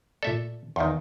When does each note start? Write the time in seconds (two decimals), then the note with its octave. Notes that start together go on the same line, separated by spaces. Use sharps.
0.23 A#2 A3 A4 D5 E5
0.76 E2 D#3 D#5 F5 C6